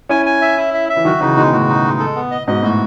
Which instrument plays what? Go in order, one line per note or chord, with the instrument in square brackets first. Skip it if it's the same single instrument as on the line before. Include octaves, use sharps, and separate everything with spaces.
[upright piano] C#4 E4 [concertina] G#5
[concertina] G#5
E5
E4
E5
E5
[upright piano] E3
[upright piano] D#3 F#3 [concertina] F#4
[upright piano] C#3 E3 [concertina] D#4
[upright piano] B2 D#3 [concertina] G#3
[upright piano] A2 C#3 [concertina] F#4
[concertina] D#4
G#3
A4
B3
D#5
[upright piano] G#2 B2 [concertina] D#5
[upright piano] A2 [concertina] F#4